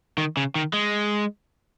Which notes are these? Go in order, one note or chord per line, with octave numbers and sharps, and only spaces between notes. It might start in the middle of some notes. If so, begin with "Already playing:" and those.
D#3
C#3
D#3
G#3